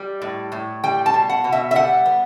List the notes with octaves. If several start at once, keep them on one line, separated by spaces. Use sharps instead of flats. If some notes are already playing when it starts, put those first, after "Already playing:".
Already playing: G3
A2
A2
G3 G5
A5
B2
F#5
B2
E5
E5
G3 F#5
B3